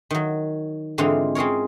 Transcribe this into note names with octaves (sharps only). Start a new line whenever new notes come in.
D#3 F#3
G#2 D3 E3 C4 D#4 F4
C4 C#4 G#4 A#4 C#5